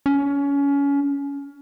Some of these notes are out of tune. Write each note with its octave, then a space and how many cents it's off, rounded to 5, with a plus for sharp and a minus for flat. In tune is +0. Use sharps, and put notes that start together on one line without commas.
C#4 +25